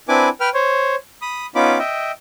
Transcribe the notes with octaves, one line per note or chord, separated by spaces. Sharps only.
C4 D4 E4 B4 G#5 D6
B4 G5 F6
C5 C#5
B5 D#6
B3 C#4 D#4 F4 B5 D6
D#5 E5 G5